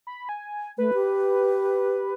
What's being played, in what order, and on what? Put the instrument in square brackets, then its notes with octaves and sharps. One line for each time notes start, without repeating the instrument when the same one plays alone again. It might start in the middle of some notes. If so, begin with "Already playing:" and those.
[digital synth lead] B5
G#5
[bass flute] A3 [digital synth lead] B4
[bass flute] G4